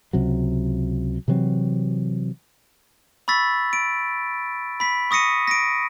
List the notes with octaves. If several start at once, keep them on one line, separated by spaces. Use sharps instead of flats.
C#2 C3 F#3
C3 E3 F#3 C4
B5 C#6 E6 A6 B6
D7
B5 B6
C#6 D#6 A#6 C#7 D#7
A#6 D7